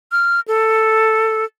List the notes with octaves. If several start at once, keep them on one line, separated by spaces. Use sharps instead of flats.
F6
A4